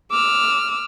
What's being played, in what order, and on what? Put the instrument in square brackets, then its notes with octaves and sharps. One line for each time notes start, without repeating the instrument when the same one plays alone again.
[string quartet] D6 E6 F6